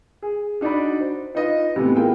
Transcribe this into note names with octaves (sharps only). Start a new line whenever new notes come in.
G#4
D4 D#4 F#4 D5 B5
C5
D#4 F4 B4 D#5
A2 C3 E3 B3
E4 F4 G#4 A#4 G5